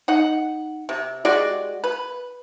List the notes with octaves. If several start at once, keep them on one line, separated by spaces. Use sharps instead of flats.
D#4 F#5
C3
G#3 F#4 G4 D5
B4